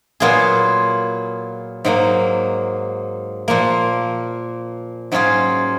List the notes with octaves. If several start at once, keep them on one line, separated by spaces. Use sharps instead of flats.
A#2 F#3 B3 F4 G#4
G#2 F#3 A#3
A#2 F3 A#3
G#2 F#3 C#4 F4 G#4